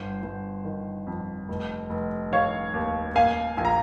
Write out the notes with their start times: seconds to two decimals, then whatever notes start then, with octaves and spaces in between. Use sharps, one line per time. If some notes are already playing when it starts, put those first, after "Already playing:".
Already playing: G1 C5
0.23 G1
0.65 D#3
1.07 F2
1.48 F1
1.90 F1
2.32 D#3 C#5 F5
2.73 D#2
3.15 A#3 F5 G#5
3.57 A#1 G#5
3.65 A#5